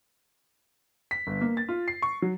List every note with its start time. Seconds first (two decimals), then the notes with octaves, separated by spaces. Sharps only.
1.11 B6
1.27 G1
1.41 A#3
1.57 A6
1.69 F4
1.88 C7
2.02 C#6
2.22 F#3